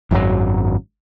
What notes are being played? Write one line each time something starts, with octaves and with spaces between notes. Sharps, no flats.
G#1 F#2 D3 F#3